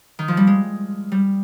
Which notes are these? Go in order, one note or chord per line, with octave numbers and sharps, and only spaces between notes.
D#3
F3
G3
G#3
G3